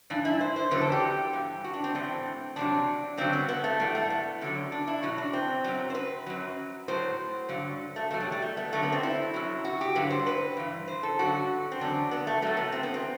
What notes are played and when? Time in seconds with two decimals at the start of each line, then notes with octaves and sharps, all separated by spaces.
0.10 G2 E3 D4
0.25 E4
0.41 C5
0.56 C5
0.71 E2 D3 F#3 B4
0.81 A4
0.92 G4
1.33 G2 E3
1.64 F#4
1.74 D4
1.84 C4
1.95 A2 E3 C4
2.56 E2 C3 F#3 D4
3.17 G2 D3 F#3 C4
3.33 B3
3.49 B3
3.64 A3
3.80 A2 E3 G3
3.95 A3
4.10 B3
4.41 F#2 D3 F#3
4.72 D4
4.87 E4
5.03 E2 B2 F#3 F#4
5.18 D4
5.33 C4
5.64 F#2 F#3
5.90 C5
5.95 B4
6.26 F#2 F#3
6.88 A2 F#3 C5
7.49 G2 D3 F#3
7.96 A3
8.11 E2 B2 F#3 A3
8.20 G3
8.32 G3
8.42 A3
8.57 B3
8.72 F#2 D3 F#3 A3
8.83 B3
8.92 C4
9.03 E4
9.34 F#2 F#3
9.65 F#4
9.81 G4
9.95 G2 D3 F#3 B4
10.10 C5
10.26 B4
10.57 G2 E3
10.88 C5
11.03 A4
11.19 G2 D3 F#3 F#4
11.72 C4
11.80 E2 D3 F#3 D4
12.11 B3
12.27 A3
12.42 A2 F#3 A3
12.57 B3
12.72 C4
12.83 B3
12.94 C4